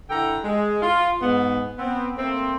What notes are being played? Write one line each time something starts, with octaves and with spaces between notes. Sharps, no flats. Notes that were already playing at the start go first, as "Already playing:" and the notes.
D3 E4 A4 G5 A#5
G#3
F4
G#2 B3
B3 C4
A3 A#3 C4